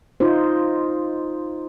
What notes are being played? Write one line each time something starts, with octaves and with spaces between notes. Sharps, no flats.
D#4 F4 C5